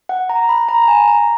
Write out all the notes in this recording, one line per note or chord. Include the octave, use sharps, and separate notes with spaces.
F#5
A#5
B5
A#5
G#5
A#5